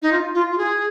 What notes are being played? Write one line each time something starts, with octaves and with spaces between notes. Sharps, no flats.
D#4
F4
F4
F4
G#4